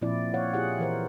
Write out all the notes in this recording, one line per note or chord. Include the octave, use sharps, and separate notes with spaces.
A#2 F3 C4 E4 D5
C#5 F5 F#5
E4 F4 G4 G#4 F#5
E3 A#4 C5